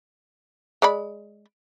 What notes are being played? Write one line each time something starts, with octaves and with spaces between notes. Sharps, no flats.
G#3 D5 B5